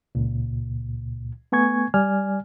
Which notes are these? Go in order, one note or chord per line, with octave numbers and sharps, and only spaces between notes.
C#2 A#2
A3 B3 G#5 C#6 G#6
G3 D5 G#5 F6